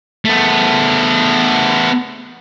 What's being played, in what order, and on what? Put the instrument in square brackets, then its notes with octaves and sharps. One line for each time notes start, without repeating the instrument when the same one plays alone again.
[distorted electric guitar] A3 B3